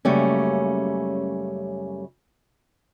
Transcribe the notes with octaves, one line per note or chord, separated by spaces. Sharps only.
F#2 C#3 G3 A3 A#3 C#4